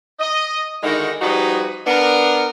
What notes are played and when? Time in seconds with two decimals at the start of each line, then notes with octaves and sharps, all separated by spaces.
0.19 D#5
0.83 D3 D#3 G#3 D#4 E4 F#4
1.21 F3 G3 D#4 F#4 G#4 B4
1.86 B3 D4 A#4